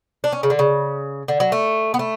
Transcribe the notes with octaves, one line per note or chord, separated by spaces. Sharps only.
D4
C#4
C#3
D3
C#3
D3
F#3
A3
B3
A3